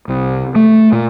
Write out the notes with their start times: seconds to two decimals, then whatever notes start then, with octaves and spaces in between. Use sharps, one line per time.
0.08 C2
0.55 A3
0.92 A#2